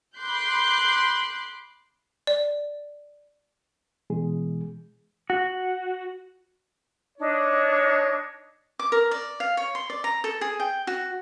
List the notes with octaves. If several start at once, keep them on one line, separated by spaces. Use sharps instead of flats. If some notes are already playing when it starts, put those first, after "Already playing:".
B5 C6 D6 F#6 G6 C7
D5
B2 E3 G#3 G#4
F#4
D4 D#4 C#5
D6
A#4
D5
F5
C#5
C6
D5
A#5
A4
G#4
G5
F#4